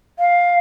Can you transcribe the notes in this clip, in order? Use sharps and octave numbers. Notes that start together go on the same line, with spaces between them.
F5